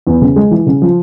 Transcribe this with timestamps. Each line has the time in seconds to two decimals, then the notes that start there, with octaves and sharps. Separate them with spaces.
0.07 E2
0.21 C#3
0.36 G#3
0.51 E3
0.66 C#3
0.82 F3